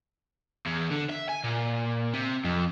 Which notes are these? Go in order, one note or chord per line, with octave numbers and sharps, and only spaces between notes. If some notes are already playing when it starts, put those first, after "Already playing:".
E2
D3
E5
G#5
A#2
C3
F2